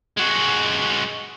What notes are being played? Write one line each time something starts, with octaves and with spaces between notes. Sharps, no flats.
G#3 F#4